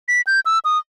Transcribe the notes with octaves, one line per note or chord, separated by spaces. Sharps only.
B6
G6
E6
D#6